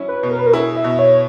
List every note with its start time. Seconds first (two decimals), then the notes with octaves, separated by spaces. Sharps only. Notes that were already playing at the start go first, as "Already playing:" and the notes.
Already playing: F#3 C#4 E4
0.08 B4
0.23 B2
0.31 A#4
0.39 B4
0.46 A#4
0.53 E4 G#4
0.76 E5
0.84 B2
0.99 C#5